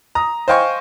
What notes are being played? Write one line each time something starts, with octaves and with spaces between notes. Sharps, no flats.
A#5 D#6
C5 D#5 F5 G5 G#5 C#6